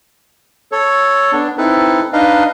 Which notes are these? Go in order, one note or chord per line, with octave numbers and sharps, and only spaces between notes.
A4 C#5
B3 D4
C4 D#4 E4 A4 B4
D4 D#4 B4 D#5 F5